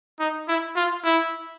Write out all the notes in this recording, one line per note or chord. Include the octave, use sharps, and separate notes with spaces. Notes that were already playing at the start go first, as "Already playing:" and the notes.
D#4
E4
F4
E4